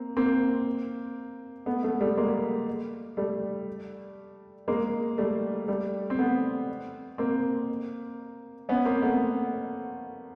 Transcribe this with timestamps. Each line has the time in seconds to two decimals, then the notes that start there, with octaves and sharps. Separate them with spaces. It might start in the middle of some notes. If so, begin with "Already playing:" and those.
Already playing: A#3 C4
0.17 A#3 C4
1.66 A3 B3
1.83 A3 B3
2.01 G3 A3
2.17 G#3 A#3
3.17 G3 A3
4.68 G#3 A#3
5.18 G3 A3
5.68 G3 A3
6.10 C4
6.18 A3 B3
7.18 A#3 C4
8.69 B3 C#4
8.86 A#3 C4
9.02 A3 B3